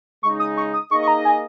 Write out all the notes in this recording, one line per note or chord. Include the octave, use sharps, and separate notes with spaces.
C#3 G#3 D#4 C#6
D#6
C#6
D#6
A#3 D#4 G#4 D#5 C#6
C#6
A#5
G#5